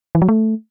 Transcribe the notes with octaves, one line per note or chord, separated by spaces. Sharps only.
E3
F#3
A3